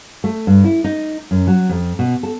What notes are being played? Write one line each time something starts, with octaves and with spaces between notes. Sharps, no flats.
A3
G2
E4
D#4
F#2
F#3
F2
B2
A4